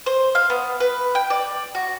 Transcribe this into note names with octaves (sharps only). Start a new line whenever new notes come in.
C5
F5
B3
B4
G5
D5
F#4